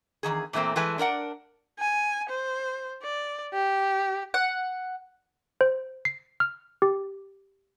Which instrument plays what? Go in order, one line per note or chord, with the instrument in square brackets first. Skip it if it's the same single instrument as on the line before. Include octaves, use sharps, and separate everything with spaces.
[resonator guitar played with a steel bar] E2 B2 D#3 G#4
A#2 E3 A3 A#3 C4
E3 G#3 A3 B4 G#5 A5
D4 A#4 D5 F#5
[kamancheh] G#5
C5
D5
G4
[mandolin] F#5
[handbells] C5
C7
F6
G4